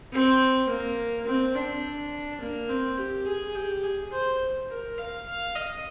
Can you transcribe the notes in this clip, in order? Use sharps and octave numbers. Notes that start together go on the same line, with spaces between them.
C4
A#3
C4
D4
A#3
C4
G4
G#4
G4
G#4
C5
A#4
F5
F5
D#5